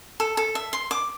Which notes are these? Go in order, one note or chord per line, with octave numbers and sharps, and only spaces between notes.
A4
A4
E5
C6
D6